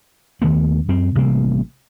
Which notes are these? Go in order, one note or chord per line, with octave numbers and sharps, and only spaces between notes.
D#2 D#3 A3 B3
F#2 C4
A1 C3 G3 A#3